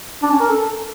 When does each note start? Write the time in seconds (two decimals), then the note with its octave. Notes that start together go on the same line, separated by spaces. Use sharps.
0.23 D4
0.31 C#4
0.40 A#4
0.49 A4